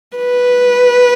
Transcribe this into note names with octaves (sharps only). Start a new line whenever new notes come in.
B4